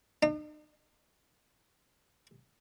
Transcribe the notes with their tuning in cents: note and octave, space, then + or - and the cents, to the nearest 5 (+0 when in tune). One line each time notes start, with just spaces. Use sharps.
D#4 -45